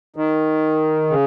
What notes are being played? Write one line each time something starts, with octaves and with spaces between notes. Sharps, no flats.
D#3
C#3